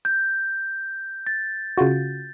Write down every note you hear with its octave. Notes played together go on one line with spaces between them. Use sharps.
G6
A6
C#3 F4 F#4